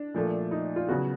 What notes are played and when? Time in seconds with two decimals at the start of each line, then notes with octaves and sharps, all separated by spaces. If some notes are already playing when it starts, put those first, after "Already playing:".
Already playing: D4
0.14 A#2 F3 A3
0.51 D#4
0.76 F4
0.89 C#3 F#3 B3 F#4